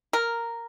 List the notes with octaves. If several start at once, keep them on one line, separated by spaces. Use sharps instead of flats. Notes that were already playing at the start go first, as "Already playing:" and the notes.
A#4